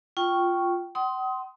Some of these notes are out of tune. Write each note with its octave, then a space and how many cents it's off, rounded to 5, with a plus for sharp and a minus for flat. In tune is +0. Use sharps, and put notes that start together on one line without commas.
F4 +0 G5 -10 C#6 -5
F#5 +45 C6 -5 D#6 +25